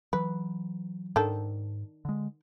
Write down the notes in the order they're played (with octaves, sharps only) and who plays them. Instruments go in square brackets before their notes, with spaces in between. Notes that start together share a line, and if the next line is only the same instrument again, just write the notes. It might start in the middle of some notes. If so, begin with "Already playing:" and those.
[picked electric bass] E3 F#3 [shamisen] B4
[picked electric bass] G#2 [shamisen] D#3 D4 A4
[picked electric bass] D3 G#3